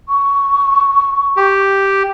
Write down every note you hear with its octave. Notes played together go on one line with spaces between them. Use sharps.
C#6
G4